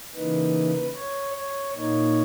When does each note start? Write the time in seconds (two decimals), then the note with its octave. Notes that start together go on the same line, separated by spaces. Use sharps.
0.14 C#3 E3 A#3 D#4 B4
0.94 C#5
1.34 C#5
1.74 A#2 A#3 D#4 C#5